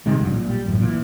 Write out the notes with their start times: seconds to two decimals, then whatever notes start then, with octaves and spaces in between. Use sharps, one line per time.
0.06 C3 D#3 G3 G#3
0.20 F1 G2 F#3
0.31 A#1 A#2
0.48 G3
0.66 A1 F#2 A2
0.80 A#2 E3